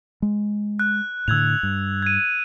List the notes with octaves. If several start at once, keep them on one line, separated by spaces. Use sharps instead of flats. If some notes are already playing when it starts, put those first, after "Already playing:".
G#3
F#6
A2 D3 E6 G#6 F7
G2
G#6 D#7